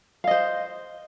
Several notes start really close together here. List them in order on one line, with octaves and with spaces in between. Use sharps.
F5 D#5 C5